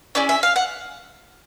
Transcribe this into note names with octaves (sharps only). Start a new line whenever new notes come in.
C#4 E4 G#4 D5
E5
F5
F#5